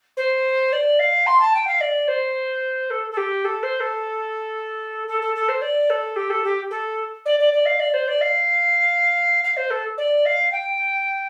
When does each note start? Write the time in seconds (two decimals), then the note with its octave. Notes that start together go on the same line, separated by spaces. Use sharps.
0.17 C5
0.72 D5
0.99 F5
1.26 C6
1.40 A5
1.54 G5
1.67 F5
1.80 D5
2.08 C5
2.90 A4
3.11 A4
3.17 G4
3.44 A4
3.63 C5
3.80 A4
5.07 A4
5.22 A4
5.35 A4
5.48 C5
5.61 D5
5.90 A4
6.16 G4
6.30 A4
6.44 G4
6.70 A4
7.25 D5
7.39 D5
7.53 D5
7.65 F5
7.79 D5
7.93 C5
8.07 D5
8.21 F5
9.44 F5
9.56 C5
9.70 A4
9.97 D5
10.25 F5
10.52 G5